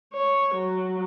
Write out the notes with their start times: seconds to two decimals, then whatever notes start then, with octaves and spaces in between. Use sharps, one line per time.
0.13 C#5
0.54 F#3